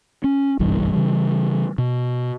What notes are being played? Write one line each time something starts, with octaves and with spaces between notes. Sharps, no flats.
C#4
F#1 B1 G2 E3
C#3 E3 G3
B2